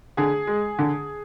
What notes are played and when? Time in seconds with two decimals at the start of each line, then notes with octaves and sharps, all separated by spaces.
0.17 D3 G#4
0.47 G#3
0.79 D3